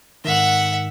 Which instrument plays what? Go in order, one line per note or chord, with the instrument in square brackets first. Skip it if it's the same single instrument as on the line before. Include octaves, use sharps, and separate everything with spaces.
[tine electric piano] G#2 D#3 [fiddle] E5 F#5